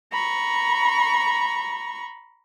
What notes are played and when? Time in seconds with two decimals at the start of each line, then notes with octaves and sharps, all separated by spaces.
0.13 A#5 B5 C#6